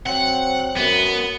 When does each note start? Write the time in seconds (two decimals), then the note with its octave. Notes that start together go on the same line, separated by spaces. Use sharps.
0.06 F#3 C4 F#5
0.77 F#2 B3